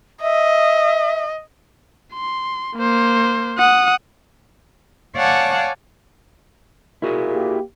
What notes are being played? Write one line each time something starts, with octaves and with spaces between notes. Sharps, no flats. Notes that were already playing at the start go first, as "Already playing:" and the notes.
D#5 E5
C6
A#3 C5
F#5 D#6
C#5 D5 F5 F#5 G#5 A5
A#2 E4 F#4 G#4
A#3 G4